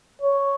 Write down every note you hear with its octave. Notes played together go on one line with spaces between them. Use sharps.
C#5